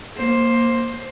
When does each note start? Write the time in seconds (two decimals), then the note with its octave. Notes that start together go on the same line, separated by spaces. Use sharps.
0.15 A#3 C5